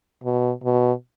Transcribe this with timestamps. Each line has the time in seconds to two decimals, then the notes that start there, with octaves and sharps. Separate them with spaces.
0.24 B2
0.64 B2